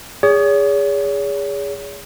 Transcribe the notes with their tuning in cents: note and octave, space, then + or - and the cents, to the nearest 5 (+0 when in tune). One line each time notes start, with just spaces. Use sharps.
G#4 -20 C#5 +40